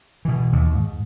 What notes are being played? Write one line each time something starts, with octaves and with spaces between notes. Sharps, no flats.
B2 E3
D#2
G#2